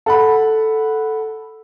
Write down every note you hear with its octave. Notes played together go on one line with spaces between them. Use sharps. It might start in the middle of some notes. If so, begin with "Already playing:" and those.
A4 F#5 B5